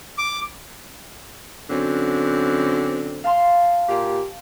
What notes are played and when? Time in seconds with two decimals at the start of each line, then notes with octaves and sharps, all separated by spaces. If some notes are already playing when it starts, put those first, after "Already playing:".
0.18 D6
1.70 F#2 D3 C4
3.24 F5 A5 C6
3.89 A#2 G4